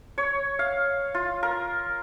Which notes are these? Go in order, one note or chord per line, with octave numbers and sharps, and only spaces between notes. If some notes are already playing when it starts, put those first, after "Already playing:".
C#5
F5
F4
A#4